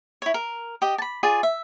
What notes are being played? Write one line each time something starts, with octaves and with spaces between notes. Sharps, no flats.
E4 C#5
A#4
G4 D#5
A5 B5
F4 G#4 D5 G#5
E5